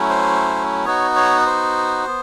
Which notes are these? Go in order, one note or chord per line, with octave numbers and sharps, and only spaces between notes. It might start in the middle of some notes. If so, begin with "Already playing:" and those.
Already playing: F#3 A3 C#4 E4
C5
B3 D#4 F#4 C#5
C#5
C5
B3